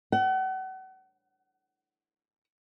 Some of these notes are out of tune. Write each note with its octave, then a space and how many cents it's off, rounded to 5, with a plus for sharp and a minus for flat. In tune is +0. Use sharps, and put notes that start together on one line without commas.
F#5 +35